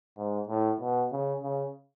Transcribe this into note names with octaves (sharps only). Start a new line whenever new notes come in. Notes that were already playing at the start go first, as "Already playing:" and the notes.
G#2
A2
B2
C#3
C#3